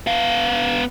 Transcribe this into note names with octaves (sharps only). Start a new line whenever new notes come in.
B3 F5